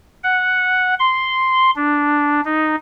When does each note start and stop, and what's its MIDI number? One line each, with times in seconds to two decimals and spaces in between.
0.24 0.94 78
0.99 1.70 84
1.76 2.41 62
2.45 2.76 63